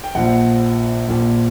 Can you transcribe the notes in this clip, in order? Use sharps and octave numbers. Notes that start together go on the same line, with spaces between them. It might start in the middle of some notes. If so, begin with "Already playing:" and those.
G5
A#1 A#2 F3 F#5
A#1 A#2 F3